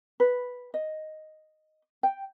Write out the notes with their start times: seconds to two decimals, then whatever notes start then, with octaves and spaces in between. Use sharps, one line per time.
0.20 B4
0.74 D#5
2.03 G5